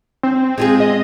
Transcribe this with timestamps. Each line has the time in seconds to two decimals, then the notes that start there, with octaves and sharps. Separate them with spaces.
0.23 C4
0.58 G#3 F4 G#4
0.80 D#5